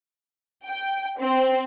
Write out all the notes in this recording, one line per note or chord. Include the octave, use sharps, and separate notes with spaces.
G5
C4